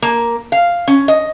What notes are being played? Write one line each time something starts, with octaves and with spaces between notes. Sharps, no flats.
A#3
F5
C#4
D#5